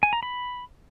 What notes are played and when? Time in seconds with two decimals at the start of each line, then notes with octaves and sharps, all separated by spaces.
0.03 G#5
0.13 A#5
0.23 B5